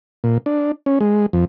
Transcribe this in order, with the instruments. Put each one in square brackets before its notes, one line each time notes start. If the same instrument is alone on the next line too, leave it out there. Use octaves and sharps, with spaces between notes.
[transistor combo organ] A#2
D4
C#4
G#3
F2